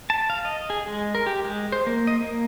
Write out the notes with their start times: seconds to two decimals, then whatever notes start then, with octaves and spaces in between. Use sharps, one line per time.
0.10 A5
0.30 F5
0.45 D#5
0.70 G#4
0.87 G#3
1.15 A#4
1.27 G4
1.45 G#3
1.72 C5
1.87 A#3
2.07 D#5
2.22 A#3